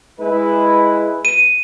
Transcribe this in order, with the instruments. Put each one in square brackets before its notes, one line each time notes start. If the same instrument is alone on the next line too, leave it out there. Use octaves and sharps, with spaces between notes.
[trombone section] G#3 E4 B4
[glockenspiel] D#7